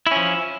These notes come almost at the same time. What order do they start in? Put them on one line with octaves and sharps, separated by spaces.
E4 C#4 F3